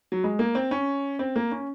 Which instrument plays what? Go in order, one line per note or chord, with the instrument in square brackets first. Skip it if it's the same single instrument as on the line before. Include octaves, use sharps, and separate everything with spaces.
[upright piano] F#3
G#3
A#3
C4
C#4
C4
A#3
C#4